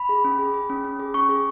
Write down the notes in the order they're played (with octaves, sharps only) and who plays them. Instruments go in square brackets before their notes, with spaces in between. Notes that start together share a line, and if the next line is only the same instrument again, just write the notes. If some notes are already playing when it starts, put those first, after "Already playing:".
Already playing: [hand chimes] B5
G#4
C#4
G#4
G#4
C#4
C#4
G#4
C#4 C#6
G#4